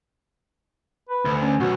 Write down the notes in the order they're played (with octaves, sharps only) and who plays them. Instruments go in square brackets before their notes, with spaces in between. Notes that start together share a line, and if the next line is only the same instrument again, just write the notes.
[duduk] B4
[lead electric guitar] D2
[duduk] C#4
[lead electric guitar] B1 [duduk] F#4